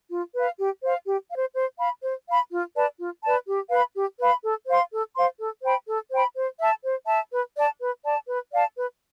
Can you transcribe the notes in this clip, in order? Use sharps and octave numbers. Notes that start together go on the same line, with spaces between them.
F4
B4 F5
G4
C5 F5
G4
F5
C5
C5
F5 B5
C5
F5 B5
F4
B4 D5 A5
F4
B4 D5 A5
G4
B4 F5 B5
G4
B4 F5 B5
A4
C5 F5 C6
A4
C5 F5 C6
A4
C5 G5 B5
A4
C5 G5 B5
C5
E5 A5
C5
E5 A5
B4
D5 A5
B4
D5 A5
B4
D5 F5 A5
B4